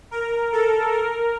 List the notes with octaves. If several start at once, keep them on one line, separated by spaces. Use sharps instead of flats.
A#4
A4
A#4